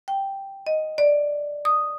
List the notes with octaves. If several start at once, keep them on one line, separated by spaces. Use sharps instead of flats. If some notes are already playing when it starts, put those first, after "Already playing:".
G5
D#5
D5
D#6